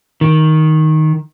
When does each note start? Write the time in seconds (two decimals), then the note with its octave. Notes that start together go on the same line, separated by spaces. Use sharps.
0.21 D#3